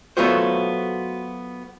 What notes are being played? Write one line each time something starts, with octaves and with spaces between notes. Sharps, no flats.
F#3 A3 B3 F4 F#4 C5